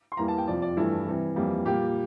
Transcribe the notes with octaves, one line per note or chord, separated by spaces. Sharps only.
C6
E2 E3 G3 A#3 A#5
A5
G5
F2 C3 F3 D5
D5
G2 E3 A3 E4
C3 E3 G3
F2 E3 G3 A#3
A#2 G3 A#3 G4